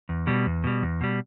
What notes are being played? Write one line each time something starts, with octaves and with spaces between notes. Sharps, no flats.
E2
B2 G3
E2
B2 G3
E2
B2 G3